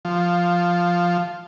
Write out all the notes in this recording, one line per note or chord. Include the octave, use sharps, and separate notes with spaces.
F3